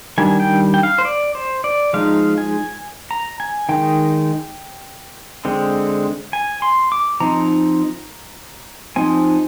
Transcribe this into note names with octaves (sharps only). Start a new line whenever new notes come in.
D#3 G3 D4 G#5
G5
G5
F5
C5
D5
C5
D5
F3 G#3 D#4 F5
G#5
A#5
G#5
D#3 G#3 D#4 G5
D3 G#3 C4
G#5
C6
D6
F3 C4 D#4 A#5
F3 C4 D#4 G#5